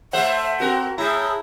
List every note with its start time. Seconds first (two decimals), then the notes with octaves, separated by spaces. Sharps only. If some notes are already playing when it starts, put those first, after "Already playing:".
0.13 A3 C5 E5 F#5
0.60 C4 F#4 A#4
0.98 A2 E4 G#4 A#5